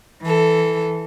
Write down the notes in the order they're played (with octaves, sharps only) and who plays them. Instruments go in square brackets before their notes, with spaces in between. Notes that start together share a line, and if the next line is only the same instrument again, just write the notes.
[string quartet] E3 A4